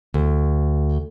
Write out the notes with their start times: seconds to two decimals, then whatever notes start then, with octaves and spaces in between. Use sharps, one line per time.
0.14 D2